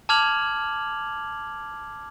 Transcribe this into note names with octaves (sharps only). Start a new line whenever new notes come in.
A5 D6 F6 G#6 F7 F#7